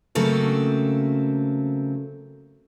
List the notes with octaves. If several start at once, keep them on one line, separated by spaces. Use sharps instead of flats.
C#3 F#3 A3 A#3 C4 A4